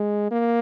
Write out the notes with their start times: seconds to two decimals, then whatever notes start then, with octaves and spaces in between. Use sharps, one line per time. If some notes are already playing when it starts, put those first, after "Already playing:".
Already playing: G#3
0.31 A#3